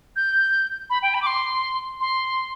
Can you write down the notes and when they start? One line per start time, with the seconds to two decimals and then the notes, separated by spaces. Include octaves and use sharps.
0.16 G6
0.90 B5
1.02 G5
1.14 B5
1.22 D6
1.27 C6
2.01 C6